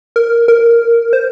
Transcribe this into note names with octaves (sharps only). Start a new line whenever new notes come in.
A#4
A#4
C5